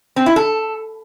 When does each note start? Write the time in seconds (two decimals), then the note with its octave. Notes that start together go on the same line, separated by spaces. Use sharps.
0.16 C4
0.26 E4
0.36 A4